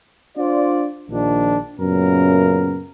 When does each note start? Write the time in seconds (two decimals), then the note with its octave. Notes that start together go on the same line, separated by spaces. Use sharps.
0.36 D4 F4 C5 D5
1.10 A#1 D#3 F3 D4
1.79 F#2 A#2 C#3 B3 A#4